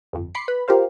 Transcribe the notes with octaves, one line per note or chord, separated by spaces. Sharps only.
G1 F2
B5 C6 D6 C7 C#7
B4 B5
F4 G4 A#4 C5 F5